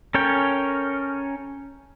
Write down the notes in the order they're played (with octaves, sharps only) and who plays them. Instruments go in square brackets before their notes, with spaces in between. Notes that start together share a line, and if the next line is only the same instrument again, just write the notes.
[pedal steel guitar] C#4 A4 A#4 C#5 G5